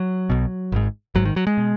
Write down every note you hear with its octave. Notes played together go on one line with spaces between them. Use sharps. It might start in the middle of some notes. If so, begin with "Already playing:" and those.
Already playing: F#3
B1 B2
G#1 G#2
G#1 G#2 F#3
D#3
F#3
G#3
B2